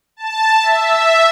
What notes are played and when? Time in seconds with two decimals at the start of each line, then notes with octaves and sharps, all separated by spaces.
0.17 A5
0.61 E5